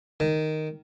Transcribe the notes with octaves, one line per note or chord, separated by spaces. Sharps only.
D#3